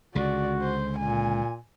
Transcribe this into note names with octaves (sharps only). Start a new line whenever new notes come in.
C#2 D3 F#4 D5
C5
A#2 G#5